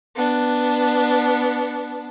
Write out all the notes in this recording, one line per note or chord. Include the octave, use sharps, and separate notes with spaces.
B3 D4